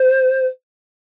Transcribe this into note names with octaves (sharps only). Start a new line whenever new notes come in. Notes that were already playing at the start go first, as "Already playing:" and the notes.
Already playing: C5